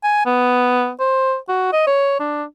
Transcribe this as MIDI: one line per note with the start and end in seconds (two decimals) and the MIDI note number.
0.04 0.23 80
0.26 0.90 59
1.00 1.36 72
1.49 1.73 66
1.73 1.85 75
1.87 2.17 73
2.20 2.44 62